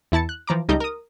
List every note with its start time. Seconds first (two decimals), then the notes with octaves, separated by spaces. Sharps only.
0.12 E2 E4 A5 A6 C#7
0.29 F#6
0.47 E3 F3 A#5 D6
0.69 C#2 G3 A3 D#4 D#5 G6
0.80 A#4 D#6